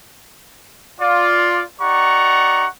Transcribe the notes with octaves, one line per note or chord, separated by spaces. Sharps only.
F4 D5
D#4 G4 D5 F#5 A#5 C#6